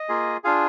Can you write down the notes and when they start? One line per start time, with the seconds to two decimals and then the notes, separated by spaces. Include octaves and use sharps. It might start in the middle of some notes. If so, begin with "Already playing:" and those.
Already playing: D#5
0.09 A#3 F4 G#4
0.44 D4 F4 G#4 F5